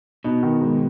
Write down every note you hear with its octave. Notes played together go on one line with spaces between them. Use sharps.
B2 D#4
D#3
G#2